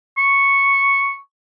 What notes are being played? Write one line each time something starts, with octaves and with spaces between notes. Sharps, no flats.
C#6